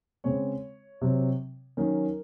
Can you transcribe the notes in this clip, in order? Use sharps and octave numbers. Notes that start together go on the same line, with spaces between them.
C#3 G#3 C4 C#5
C3 F#3 C4
D#3 F#3 C#4 A#4